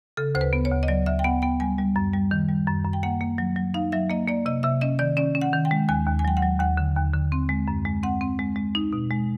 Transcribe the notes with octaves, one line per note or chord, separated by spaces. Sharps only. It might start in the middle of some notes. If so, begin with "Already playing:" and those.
C#3 A4
D2 C5
B4
B3
C#5
D2
D#5
F#3 D5
D2 E5
G5
B3 F#5
B3 G5
G3 G#5
G3
F#2
G3
D#3
G3
F#2
F#2
G5
A#3 F#5
A#3
F#3
F#3
D#4 F5
F#3 E5
A#3 D#5
A#3 D5
C3 D#5
C3 E5
C#4 D#5
D#3 D5
C#4 D5
C#4
F#5
D#3
G5
G#3
D#2 G#5
D#2
G#5
F#3 G5
F#5
F#3
D#2 F#5
D3
D#2
D3
C4
G#3
F#2
G#3
C4 F#5
C4
G#3
G#3
D#4
B2
G#3